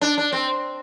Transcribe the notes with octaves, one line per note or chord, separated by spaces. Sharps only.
D4
D4
C4